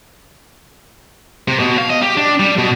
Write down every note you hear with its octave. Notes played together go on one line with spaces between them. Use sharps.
C3
B2
F5
D#5
G4
D4
G3
B2